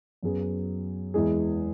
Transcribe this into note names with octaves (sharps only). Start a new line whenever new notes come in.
F#2 F#3 B3 G#4
E2 E3 G#3 E4 G#4